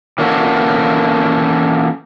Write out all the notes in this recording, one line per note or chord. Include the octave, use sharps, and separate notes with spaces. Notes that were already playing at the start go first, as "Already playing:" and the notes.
E3 A#3 C#4 F#4 A4